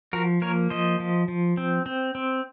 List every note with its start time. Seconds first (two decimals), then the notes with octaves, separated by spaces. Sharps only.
0.13 F3 F#4 A#4
0.42 A#3 A#4 C#5
0.70 F3 C5 D#5
1.00 F3
1.28 F3
1.57 C4
1.86 C4
2.15 C4